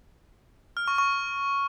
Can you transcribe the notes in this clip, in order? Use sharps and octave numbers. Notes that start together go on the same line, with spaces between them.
F6
C#6
C#6